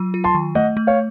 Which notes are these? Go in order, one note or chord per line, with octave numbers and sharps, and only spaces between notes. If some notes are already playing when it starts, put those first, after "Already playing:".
Already playing: F#3 F4
F4
A5 C6
D#3
A3 D#5 F#5
A3
C#5 F5